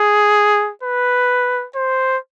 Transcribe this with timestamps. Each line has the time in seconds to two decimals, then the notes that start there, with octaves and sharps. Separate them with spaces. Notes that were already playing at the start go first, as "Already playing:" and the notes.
Already playing: G#4
0.83 B4
1.76 C5